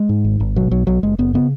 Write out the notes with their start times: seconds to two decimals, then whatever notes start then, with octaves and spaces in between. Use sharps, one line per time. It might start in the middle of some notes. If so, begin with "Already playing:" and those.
Already playing: G#3
0.09 G#2
0.24 G#1
0.40 G#1
0.56 B2 F#3
0.71 B1 F#3
0.87 B1 F#3
1.03 F#1 G#3
1.18 F#1 B3
1.34 C#3 B3